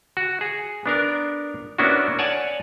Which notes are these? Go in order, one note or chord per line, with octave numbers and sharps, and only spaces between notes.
F#4
G#4
B3 D4 A#4
A#3 B3 C#4 D4 E4 F#4
C#5 D5 F#5 G#5 A5